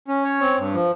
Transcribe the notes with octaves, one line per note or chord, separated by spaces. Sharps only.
C#4
C#5
C4
G2
F3